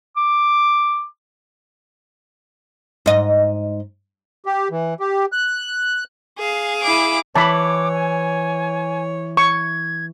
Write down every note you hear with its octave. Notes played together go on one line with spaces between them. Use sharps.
D6
G#2 D#5
G4
E3
G4
F#6
G#4 F5
E4 D6
E3 C#5 A5 B5 D6
G#5
C#6 G#6